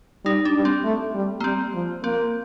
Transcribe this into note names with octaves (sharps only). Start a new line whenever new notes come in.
G3 D#4
D4
G3
C4
A3
G3
A#3
G3 C4
F3
A#3 C4